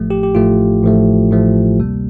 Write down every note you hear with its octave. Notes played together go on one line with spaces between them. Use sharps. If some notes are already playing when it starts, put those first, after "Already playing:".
Already playing: A1 A2 F3 A3
G4
G4
A1 A2 F3 A3 F4
A1 A2 F3 A3
A1 A2 F3 A3
D2 C3 G3 A#3